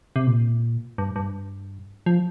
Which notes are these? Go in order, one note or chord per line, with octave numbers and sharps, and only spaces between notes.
C3
A#2
G2
G2
F3